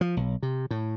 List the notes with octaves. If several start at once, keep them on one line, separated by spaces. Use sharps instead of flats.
F3
B1
C3
A2